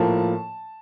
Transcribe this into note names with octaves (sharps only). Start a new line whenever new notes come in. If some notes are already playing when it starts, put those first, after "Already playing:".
Already playing: A2 F3 A#3 A5